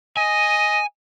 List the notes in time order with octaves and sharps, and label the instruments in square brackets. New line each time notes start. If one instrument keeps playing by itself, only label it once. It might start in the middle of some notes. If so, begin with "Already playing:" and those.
[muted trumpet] D#5 [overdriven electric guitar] G#5